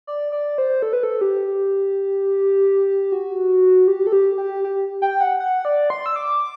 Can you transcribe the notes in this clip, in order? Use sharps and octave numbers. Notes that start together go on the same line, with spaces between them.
D5
D5
C5
A4
B4
A4
G4
F#4
G4
A4
G4
G4
G4
G5
F#5
F#5
D5
C6
E6
D6